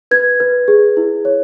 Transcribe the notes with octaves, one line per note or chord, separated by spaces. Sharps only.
B4 G#6
B4
G#4
E4
C#5